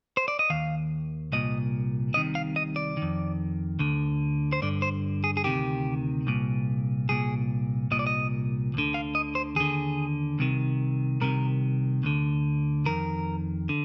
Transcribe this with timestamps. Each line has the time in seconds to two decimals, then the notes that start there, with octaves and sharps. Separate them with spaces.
0.17 C5
0.28 D5
0.39 D#5
0.50 D#2 D#3 F5
1.32 C2 A#2 D#5
2.14 C2 C3 D#3 D#5
2.35 F5
2.56 D#5
2.76 D5
2.97 F2 D#3
3.79 D2 D3
4.53 C5
4.62 G2 D3 D5
4.82 C5
5.24 G#4
5.37 G#4
5.44 D2 C3 D#3 G4
6.27 C2 A#2
7.09 C2 A#2 G#4
7.91 C2 A#2 D#5
7.99 D5
8.07 D#5
8.74 D2 D3
8.94 F5
9.15 D#5
9.35 C5
9.56 D#2 D3 G#4
10.39 C2 C3 D#3
11.21 C2 C3 D#3 A#4
12.03 D2 D3
12.86 F2 D#3 A#4
13.69 D3